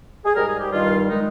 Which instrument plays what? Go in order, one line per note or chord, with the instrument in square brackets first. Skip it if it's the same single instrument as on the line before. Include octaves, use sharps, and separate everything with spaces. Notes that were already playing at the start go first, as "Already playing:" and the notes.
[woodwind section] G#4
G#2 G3 A#4
G#4
G4
G2 D#3 G3 F4
D#3 G#3 D#4